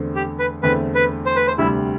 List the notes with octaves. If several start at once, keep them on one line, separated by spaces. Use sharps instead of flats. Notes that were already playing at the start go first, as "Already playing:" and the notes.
Already playing: E2 D3 A3 C4
G4
B4
E2 D3 A3 C4 B4
B4
C5
B4
C5
D2 C3 G3 E4